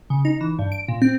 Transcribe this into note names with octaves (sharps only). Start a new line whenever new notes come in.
C#3
D#4
E3
G2
D7
A#2
C4